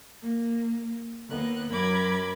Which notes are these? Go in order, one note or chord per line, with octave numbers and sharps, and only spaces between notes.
A#3
D#2 D#3 A#3 B3 F#6
F#2 F#3 A#4 B5 D6 G#6